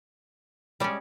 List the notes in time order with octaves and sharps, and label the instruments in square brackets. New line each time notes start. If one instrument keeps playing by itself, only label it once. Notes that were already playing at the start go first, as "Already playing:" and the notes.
[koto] G3 C#4 [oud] G#3 D5